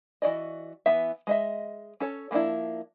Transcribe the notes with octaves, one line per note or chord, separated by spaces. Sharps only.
E3 F#4 D5 D#5
E3 B3 E5
G#3 D#5 E5
C#4 A4 C#5
F3 A#3 B3 D4 E4